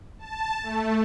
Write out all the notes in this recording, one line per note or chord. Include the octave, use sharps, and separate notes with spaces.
A5
A3